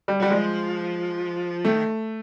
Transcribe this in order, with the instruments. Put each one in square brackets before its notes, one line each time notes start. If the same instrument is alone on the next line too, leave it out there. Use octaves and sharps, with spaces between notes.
[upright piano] G3
[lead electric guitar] F#3 [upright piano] G3
[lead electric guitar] F3 [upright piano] G#3
[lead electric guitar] D#3 [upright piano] A3